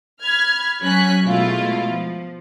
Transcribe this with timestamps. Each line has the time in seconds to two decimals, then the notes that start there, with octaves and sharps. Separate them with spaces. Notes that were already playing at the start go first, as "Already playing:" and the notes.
0.22 B5 F6 G#6
0.82 F#3 C#4 G#5 F#6 B6
1.25 B2 G#3 A3 E4 F4
1.89 F3